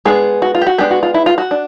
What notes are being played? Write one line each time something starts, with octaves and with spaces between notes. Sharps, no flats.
G#3 B3 D4 G#4
F#4
F4
G4
F#4
G#3 B3 D4 G4
F#4
F4
E4
F4
F#4
D4